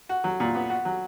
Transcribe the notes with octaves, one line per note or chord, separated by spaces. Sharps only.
F#4
F#3
A#2
B3
F#4
F#3